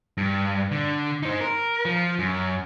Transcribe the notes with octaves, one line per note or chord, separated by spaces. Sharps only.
G2
D3
D#4 C5
A#4
F3
F#2